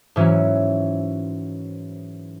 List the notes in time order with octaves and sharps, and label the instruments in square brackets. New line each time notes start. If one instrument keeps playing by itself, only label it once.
[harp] G#2 E3 F#3 C#4 E4